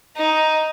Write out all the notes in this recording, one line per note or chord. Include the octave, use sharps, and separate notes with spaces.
D#4